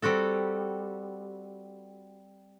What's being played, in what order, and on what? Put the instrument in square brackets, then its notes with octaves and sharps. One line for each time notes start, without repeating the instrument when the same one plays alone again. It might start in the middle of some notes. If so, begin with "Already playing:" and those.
[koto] G3 C4 F#4 A4